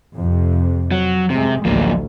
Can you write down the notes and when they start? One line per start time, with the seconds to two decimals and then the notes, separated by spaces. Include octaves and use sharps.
0.16 F2 C3
0.91 F#3
1.30 F#2 C3 G#3
1.65 A1 D2 F3 F#3 A#3